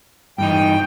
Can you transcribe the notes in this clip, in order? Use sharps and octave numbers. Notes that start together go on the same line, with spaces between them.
G2 E3 D#4 G5